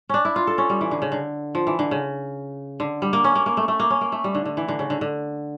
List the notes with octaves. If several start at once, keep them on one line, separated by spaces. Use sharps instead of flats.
C#4 D4
E4
F4
A4
C#4
G3
E3
D3
C#3
D3
F3
E3
D3
C#3
D3
G3
A#3
C#4
A#3
A#3
A3
A3
A#3
C#4
A#3
A3
G3
D3
D3
E3
D3
C#3
D3
D3